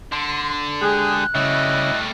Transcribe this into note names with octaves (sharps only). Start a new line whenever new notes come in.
D3 C6
G#3 G4 G#4 F#6
F#2 C#3 G3 A3 E4 D#5